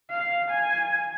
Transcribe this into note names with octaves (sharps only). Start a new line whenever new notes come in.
F5
G#5